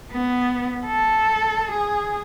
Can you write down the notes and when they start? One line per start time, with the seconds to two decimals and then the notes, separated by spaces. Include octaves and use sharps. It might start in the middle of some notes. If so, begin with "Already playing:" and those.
0.12 B3
0.87 A4
1.72 G#4